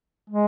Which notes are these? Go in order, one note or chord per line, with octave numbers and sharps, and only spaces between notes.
G#3